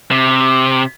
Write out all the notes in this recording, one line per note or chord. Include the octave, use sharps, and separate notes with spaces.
C3